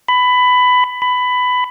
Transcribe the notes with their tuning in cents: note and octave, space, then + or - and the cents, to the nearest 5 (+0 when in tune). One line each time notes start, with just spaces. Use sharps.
B5 +15
B5 +15